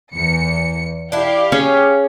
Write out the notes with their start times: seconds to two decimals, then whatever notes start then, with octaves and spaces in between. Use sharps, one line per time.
0.14 E2 C#7
1.12 D4 E4 G4 F5
1.52 C#4 G#4